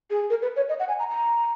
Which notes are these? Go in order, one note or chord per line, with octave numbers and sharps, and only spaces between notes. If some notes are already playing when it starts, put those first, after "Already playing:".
G#4
A#4
B4
C#5
D#5
F#5
G#5
A#5
A#5